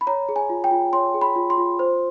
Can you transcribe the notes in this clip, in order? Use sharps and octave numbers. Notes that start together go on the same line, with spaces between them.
B5
C#5 A#5
G#4
G#5
F4
G5
F4
C#5 C6
G#4
B5
F4
C6
F4
C5